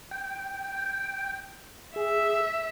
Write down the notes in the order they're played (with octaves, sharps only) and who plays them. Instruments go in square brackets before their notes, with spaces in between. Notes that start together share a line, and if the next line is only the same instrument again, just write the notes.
[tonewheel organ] G5
[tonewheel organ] G#4 [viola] E5